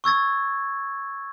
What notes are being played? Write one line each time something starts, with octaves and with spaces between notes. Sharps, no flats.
C#6 E6 G#6 A6